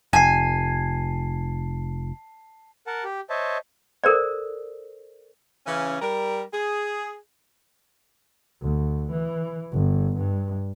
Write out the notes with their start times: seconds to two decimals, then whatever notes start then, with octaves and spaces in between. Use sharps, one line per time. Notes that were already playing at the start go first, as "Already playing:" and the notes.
0.13 F1 G#5 A5 C7
2.87 A#4 F#5 A5
3.04 G4
3.30 C5 C#5 D#5 E5 A5
4.04 A4 A#4 C5 D5
5.66 C#3 E3 C#4
6.01 G3 A#4
6.54 G#4
8.62 D2
9.12 E3
9.73 G1
10.17 G2